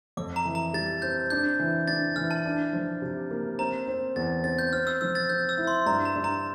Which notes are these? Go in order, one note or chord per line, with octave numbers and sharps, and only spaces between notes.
F2 D6
A#5
E3
A#5
G3 A6
C4 G6
D4 G6
E3
D4 A6
E3 F6
A5
D4
F3
C3
A#3
C4 A#5
C4
E2 A6
C4 A6
G6
C4 F6
E6
F3 E6
A6
C4 G6
E6
E4
C6
G2 A#5
A#5
G2
A#5